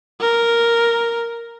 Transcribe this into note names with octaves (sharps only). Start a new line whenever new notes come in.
A#4